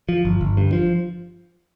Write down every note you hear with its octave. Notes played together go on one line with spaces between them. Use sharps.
F3
G1
G1
G2
F3